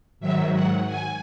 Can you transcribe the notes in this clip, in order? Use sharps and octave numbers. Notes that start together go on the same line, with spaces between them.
G#2 D#3 F#3 E5
F#5
G#5